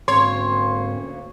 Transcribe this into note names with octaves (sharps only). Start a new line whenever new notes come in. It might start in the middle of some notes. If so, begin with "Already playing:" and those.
D2 G#2 A#3 C4 C#4 C#5 C6